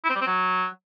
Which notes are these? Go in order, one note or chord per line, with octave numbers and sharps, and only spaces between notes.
E4
C4
G3
C4
F#3